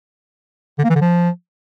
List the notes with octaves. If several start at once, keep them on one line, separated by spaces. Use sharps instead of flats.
D3
A#3
E3
D3
F3